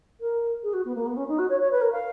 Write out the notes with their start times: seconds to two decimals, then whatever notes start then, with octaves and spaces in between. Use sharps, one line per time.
0.20 A#4
0.63 G#4
0.73 F#4
0.85 B3
0.95 A#3
1.05 B3
1.16 C#4
1.28 D#4
1.38 F#4
1.49 C#5
1.60 C#5
1.71 B4
1.81 A#4
1.92 F5